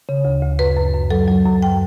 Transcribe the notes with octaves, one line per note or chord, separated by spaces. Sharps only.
C#3
D2
D2
F#2 B4
F#2
F#2
F#3 A4
F#3
F#2
G5